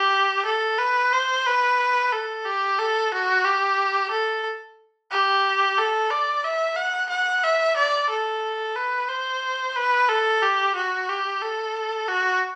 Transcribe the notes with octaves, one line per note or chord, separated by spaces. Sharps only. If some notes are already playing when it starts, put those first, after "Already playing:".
Already playing: G4
A4
B4
C5
B4
A4
G4
A4
F#4
G4
A4
G4
A4
D5
E5
F#5
F#5
E5
D5
A4
B4
C5
B4
A4
G4
F#4
G4
A4
F#4